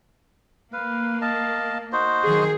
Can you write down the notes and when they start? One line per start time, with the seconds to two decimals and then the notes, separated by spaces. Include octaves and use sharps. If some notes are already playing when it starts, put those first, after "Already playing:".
0.73 A#3 B4 F5
1.21 D#5 F5 A5
1.93 D#4 F#4 C5
2.23 D#3 F#3 G#4